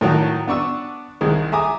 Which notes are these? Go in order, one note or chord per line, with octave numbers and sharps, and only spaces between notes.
A2 D#3 F#3 F#4
B3 D4 C#6 E6
C2 D#3 G#3
E5 G#5 A#5 D6 D#6